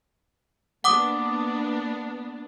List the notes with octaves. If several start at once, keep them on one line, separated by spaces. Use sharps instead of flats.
A#3 B3 D4 F#5 D6 D#6